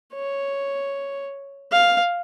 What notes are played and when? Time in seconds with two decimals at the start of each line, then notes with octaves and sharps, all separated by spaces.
0.14 C#5
1.72 F5